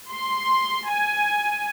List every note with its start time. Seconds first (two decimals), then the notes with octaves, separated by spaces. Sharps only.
0.12 C6
0.91 G#5